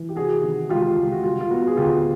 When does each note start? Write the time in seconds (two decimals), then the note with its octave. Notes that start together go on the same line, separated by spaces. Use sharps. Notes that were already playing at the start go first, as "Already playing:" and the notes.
Already playing: E3
0.09 G4
0.16 C3 F#4 G#4
0.42 D#3
0.69 C#2 F4 G4
0.97 C#2
1.12 F#4
1.23 G3 F4
1.41 F4
1.51 B3 F#4
1.67 G#4
1.77 D2 F4 G4